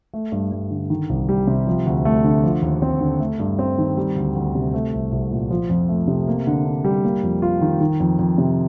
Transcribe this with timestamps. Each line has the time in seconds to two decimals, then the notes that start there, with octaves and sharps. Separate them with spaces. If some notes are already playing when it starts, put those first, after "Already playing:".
0.14 A3
0.32 G2
0.52 G2
0.71 D3
0.90 D#3
1.09 C2
1.29 G3
1.47 C3
1.67 F3
1.86 D2
2.05 A3
2.24 D3
2.43 F3
2.62 D#2
2.82 C4
3.01 D3
3.20 A3
3.40 G2
3.59 C4
3.78 D#3
3.97 G3
4.16 D2
4.35 D2
4.55 C3
4.74 A3
4.93 C2
5.12 C2
5.31 A#2
5.50 F3
5.70 F2
5.89 A3
6.08 C3
6.28 A#3
6.47 D3
6.65 D4
6.85 G3
7.04 A#3
7.23 F2
7.42 F4
7.61 D#3
7.81 D#3
8.00 F2
8.19 F2
8.38 C3